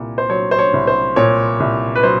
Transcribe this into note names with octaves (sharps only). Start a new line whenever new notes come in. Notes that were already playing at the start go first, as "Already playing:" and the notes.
Already playing: C2 A#2
C5
F#3 C#5
C5
C#5
C2
C5
A#2 C#5
C2
B4
F#3 C5